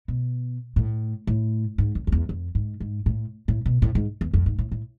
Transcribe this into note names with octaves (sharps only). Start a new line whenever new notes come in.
B2
A2
A2
G#2
F2
F2
E2
F2
G#2
G#2
A2
A2
B2
A2
G#2
E2
F2
G#2
A2
A2